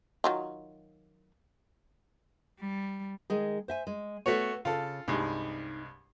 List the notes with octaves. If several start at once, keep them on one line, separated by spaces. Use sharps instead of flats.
D#3 F#3 F4
G3
D#3 G#3 G#4
C5 E5 G#5
G#3
A3 B3 F#4 C#5
C#3 F4 A4
C2 G2 G#3 D#4